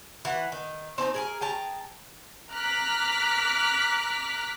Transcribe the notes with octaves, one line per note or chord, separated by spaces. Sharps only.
E3 F#5
D#3
C4 D#4 A5 A#5
G#4 A#4 G#5
G#4 G5 A5 A#5
A#5 D6 F6 F#6 B6